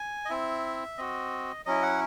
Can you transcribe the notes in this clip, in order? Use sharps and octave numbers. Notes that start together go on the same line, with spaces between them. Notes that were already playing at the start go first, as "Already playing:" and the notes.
Already playing: G#5
D#5
C4 E4 E5
C4 F#4 D#5
F#3 C#4 E4 D#5
F#5